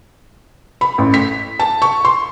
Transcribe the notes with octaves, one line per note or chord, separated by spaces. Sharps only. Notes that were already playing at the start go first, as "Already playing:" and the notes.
B5
A1
B6
A5
C#6
C6